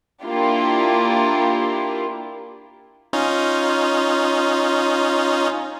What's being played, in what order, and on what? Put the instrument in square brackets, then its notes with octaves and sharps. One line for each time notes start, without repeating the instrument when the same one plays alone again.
[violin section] A#3 D4 E4 F4 G4
[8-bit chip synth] C#4 D#4 F4